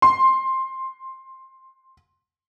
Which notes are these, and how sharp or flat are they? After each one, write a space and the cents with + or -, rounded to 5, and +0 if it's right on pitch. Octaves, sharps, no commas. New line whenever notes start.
C6 +10